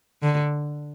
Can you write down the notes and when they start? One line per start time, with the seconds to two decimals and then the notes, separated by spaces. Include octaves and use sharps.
0.22 D3